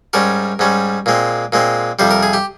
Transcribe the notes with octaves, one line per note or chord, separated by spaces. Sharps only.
G#2 G3 C#4 A#4
G#2 G3 C#4
A#2 G#3 C4
A#2 G#3 C4
F2 C3 G3 C5
A#4
G#4
G4